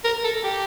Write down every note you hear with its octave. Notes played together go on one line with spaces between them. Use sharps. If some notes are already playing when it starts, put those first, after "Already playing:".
A#4
A4
G4